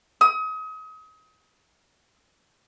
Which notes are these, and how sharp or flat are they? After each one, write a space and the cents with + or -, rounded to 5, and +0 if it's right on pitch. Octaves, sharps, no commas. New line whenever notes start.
D#6 +35